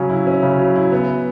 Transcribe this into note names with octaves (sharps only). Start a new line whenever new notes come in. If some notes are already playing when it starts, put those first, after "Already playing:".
Already playing: C#3 F#3 C#4
E4
C#4
C#3
F#3
E4
B3